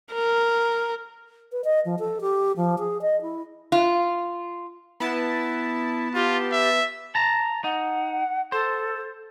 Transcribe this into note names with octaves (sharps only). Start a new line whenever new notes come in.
A#4
B4
D#5
F3
A4
G4
F3
G#4
D#5
E4
F4
B3 E4 A5
F4 G4
E5
A5 A#5
D#4 F#5
A4 C5